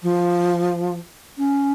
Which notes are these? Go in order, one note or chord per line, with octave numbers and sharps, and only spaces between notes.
F3
C#4